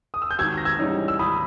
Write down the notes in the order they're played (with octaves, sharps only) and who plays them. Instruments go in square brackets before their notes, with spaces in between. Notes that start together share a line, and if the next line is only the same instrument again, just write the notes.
[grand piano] D#6
E6
G6
[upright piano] G#1 [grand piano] E6 G#6
[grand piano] A#6
E6 G#6
[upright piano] G#2 E3 G3 C#4
[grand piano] E6
[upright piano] G#1 [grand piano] B5 D#6